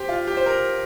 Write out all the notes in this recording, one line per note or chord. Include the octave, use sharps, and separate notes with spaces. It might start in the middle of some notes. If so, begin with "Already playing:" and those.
Already playing: G4 C5
F4
G4
C5
A#4